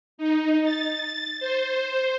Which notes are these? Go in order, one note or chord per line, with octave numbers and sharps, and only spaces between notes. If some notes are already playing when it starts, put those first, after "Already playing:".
D#4
A6
C5